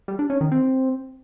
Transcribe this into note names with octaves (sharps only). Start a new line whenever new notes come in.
G3
D4
C#4
D#3
C4